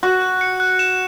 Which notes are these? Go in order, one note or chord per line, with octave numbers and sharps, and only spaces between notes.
F#4 F#6
F#6
C#7
F#6
E7